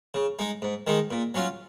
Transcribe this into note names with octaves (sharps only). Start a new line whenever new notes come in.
C#3
G#3 D#4
G#2
D#3 G#3 D#4
A#2
F#3 C#4 F4